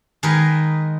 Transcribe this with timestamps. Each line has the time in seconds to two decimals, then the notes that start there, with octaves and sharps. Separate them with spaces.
0.23 D#3 G#3 G#4 A#4 B4